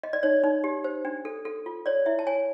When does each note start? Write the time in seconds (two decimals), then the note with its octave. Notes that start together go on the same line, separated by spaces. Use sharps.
0.03 D#5
0.13 D5
0.23 D#4 C#5
0.44 D#4
0.64 G4
0.84 C5
1.05 D4
1.25 A4
1.45 A4
1.66 F4
1.86 C#5 D5
2.06 E4 E5
2.19 A5
2.27 C#5 G#5